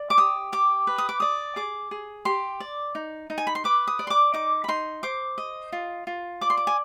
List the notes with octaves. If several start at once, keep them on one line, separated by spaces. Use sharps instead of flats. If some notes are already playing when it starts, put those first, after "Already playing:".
Already playing: D5
D6
G4 D#6
G4 D6
B4
D#6
D6
D5 D#6
G#4 D6
G#4
G4 C6
D5
D#4
D#4
G#5
B5
C6
B4 D6
D#6
D5
C6
D6
D#4 D6
B5
D#4 C6
C5 D6
D#5
F4
F4
D5 D6
C6
D6
G#5